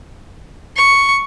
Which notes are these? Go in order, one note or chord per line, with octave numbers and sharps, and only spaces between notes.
C#6